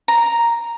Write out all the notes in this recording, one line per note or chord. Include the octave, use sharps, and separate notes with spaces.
A#5